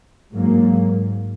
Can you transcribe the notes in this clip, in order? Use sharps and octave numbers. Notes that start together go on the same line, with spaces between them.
G#2 F#3 A#3